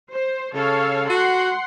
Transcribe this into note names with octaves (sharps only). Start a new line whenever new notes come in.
C5
C#3 A4 C#5 F5
F#4 F#5 C6